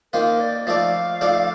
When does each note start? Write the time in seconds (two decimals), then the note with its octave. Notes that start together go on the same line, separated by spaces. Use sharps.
0.13 D#3 A#3 F4 A#4 C5
0.40 D5
0.67 F3 A3 D#4 A4 D5 F5
1.21 F3 A3 D#4 A4 D5